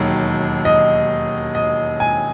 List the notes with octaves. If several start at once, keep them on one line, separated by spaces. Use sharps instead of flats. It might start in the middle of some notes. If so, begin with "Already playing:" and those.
Already playing: E1 D#2 D#3 F#3
D#5
D#5
G#5